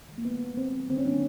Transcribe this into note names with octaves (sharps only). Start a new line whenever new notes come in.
D#3 G#3
A#3
A#2 B3
G3 A#3
D#3 C4
F#3 A#3
D3 C4
C#4
F#3 A#3 D4